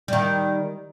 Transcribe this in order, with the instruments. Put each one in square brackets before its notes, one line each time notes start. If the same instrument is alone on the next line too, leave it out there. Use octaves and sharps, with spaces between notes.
[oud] D#3 G3